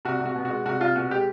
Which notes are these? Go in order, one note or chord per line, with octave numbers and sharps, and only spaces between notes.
C2 F#4
C2
F#4
B2
F#4
G#3
C2 F#4
C2 F4
B2 F#4
G#3 G4